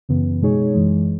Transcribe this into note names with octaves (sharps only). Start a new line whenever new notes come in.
F#2 C#3 E3 B3
B2 G#3 D#4 G#4 C#5
F#2 E3 G#3